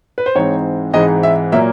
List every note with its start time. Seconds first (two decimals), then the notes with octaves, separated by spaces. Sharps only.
0.18 B4
0.26 C5
0.35 G#2 E3 G#3 C4 D#4 C#5
0.93 G#2 E3 G#3 C4 D#4 D#5
1.23 E5
1.52 A#2 F#3 A#3 E5